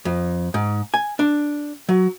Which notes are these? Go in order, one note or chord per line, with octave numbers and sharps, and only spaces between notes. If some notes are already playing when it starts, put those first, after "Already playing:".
F2
G#2
G#5
D4
F#3